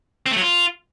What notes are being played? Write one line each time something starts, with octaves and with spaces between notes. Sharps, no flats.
C4
A3
F#3
F4